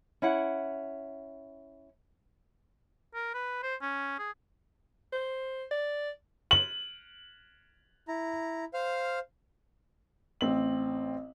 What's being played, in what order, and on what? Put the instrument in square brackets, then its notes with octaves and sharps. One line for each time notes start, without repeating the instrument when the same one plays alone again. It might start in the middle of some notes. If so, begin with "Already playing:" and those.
[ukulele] C#4 E4 F#5
[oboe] A#4
B4
C5
C#4
G#4
[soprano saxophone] C5
D5
[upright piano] F#7
[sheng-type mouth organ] E4 A#5
C5 F5 F6
[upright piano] A1 C4 F#7